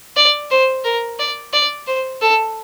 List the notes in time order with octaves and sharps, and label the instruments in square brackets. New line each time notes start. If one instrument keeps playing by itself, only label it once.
[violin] D5
C5
A#4
D5
D5
C5
A4